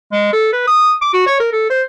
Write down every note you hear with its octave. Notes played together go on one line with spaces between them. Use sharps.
G#3
A4
B4
D#6
D6
F#4
C#5
A#4
A4
C5